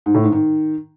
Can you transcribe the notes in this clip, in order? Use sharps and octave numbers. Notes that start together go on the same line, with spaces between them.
G#2
A2
G#2
D#3